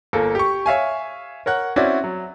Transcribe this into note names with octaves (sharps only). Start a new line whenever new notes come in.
G1 A#3 A4
G4 C#6
C#5 E5 F5 G#5
A#4 C#5 F#5 F#6
C4 C#4 E4 F#4 D5
F#3